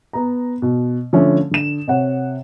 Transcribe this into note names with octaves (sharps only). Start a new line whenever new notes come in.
B3 A#5
B2
D3 F3 A3 C#4
D3 E7
C3 C#5 F#5